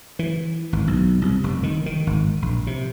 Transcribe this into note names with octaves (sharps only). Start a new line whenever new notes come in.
E3
G#1
B1
C2
F1
D#3
D#3
G#1
A#1
C3